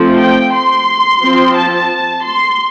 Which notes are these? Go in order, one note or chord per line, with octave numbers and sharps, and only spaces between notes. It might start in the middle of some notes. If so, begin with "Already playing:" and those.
Already playing: F3 A3 C4
G5
C6
F3 C4
A5
C6